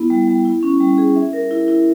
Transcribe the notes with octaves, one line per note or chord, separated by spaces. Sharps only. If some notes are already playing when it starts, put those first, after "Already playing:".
Already playing: B3 E4
G3
G3
E4
C#4
G3
G#4
E5
A#4
E4
E4